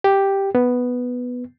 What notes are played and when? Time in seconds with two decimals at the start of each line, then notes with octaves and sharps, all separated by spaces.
0.04 G4
0.55 B3